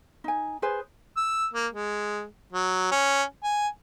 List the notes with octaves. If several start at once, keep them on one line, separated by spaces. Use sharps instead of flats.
D#4 G#5
G#4 B4 C5 G#5
E6
A#3
G#3
F#3
C#4
G#5